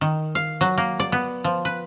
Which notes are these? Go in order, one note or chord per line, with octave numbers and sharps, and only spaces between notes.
D#3
F5
F#3
A#3
D5
B3
F3
B4